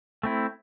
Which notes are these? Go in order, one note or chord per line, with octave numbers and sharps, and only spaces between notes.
A3 C4 E4